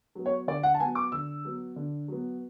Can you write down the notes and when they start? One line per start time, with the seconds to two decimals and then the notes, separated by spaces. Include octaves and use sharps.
0.15 F#3 B3
0.26 C#5
0.47 D3 D5
0.63 F#5
0.74 A5
0.80 B3 G#5
0.84 F#3
0.95 D6
1.12 D3 E6
1.45 F#3 B3
1.76 D3
2.08 F#3 B3